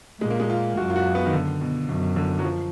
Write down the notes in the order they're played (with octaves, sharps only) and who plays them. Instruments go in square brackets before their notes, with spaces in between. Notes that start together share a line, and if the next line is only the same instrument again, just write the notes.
[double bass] A#2 [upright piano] G#3
[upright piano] A#3
G#3
F4
[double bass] F#2 [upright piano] F#4
[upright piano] F4
F#4
B3
D#3
D3
B2
[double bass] F#2 [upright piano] B2
[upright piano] D3
F#3
F3